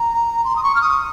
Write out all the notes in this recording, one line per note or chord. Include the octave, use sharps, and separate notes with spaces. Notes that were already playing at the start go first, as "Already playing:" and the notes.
Already playing: A#5
C6
D#6
C#6
F6
D#6